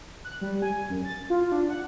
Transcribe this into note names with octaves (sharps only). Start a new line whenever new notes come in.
F#6
G3
G#5
F#2
A6
F4
D4
F#5